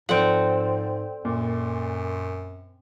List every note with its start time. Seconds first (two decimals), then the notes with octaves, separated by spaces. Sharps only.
0.09 G#2 F3 C4 A4 D5 F#5 D7
1.25 F#2 A#2